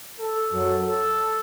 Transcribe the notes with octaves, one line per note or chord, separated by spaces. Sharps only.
A4
F#2 F#3
A4